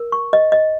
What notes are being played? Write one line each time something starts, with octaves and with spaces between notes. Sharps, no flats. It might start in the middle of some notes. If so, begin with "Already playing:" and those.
Already playing: A#4
C#6
D#5
D#5